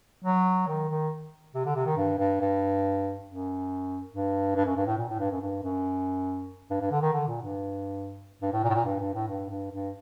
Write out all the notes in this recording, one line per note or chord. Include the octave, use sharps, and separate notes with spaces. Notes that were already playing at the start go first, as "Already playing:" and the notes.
F#3
D#3
D#3
C3
D3
C3
D#3
G2
G2
G2
F#2
G2
G2
F#2
G2
A2
A#2
A2
G2
F#2
G2
F#2
G2
G2
D3
D#3
D3
A#2
G2
G2
A2
A#2
A2
A#2
G2
G2
A2
G2
G2
G2